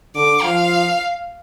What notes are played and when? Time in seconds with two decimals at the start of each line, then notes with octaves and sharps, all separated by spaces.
0.15 D3 D6
0.43 F3 F5